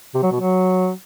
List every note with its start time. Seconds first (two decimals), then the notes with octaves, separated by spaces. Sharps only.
0.14 C3
0.23 F#3
0.32 B2
0.40 F#3